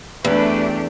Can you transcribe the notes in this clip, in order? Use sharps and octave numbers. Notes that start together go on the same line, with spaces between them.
E2 A3 D4 G4 B4